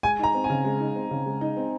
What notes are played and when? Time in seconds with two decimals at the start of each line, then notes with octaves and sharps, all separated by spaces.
0.03 G#3 G#5
0.19 D#4 A#5
0.34 C4
0.44 G#5
0.50 C#3
0.65 G#3
0.80 D#4
0.96 C4
1.11 C#3
1.26 G#3
1.41 D#4
1.57 C4